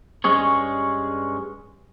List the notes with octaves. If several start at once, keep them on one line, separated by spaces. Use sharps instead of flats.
G2 G#3 C#4 G#4 C#5